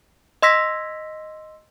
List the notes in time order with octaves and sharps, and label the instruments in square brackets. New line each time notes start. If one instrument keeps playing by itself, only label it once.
[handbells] D#5 C6 E6 A#6 B6